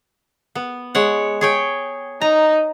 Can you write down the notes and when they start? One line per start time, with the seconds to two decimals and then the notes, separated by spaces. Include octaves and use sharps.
0.55 B3
0.95 G#3 C#5 F#5
1.41 G#4 C#5 G5
2.21 D#4 A#5